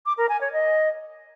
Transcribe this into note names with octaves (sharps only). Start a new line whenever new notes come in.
D6
A#4
G#5
C#5
D#5